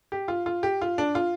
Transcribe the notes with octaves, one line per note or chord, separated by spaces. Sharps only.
G4
F4
F4
G4
F4
D4
F4